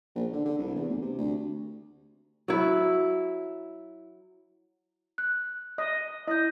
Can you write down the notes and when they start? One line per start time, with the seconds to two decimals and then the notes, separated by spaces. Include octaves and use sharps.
0.15 A#1
0.33 D3
0.45 D3
0.58 C2
0.75 E2
0.88 D2
1.02 C3
1.18 D2
2.48 F#3 E4
5.18 F#6
5.78 D#5
6.28 E4 D#5 G6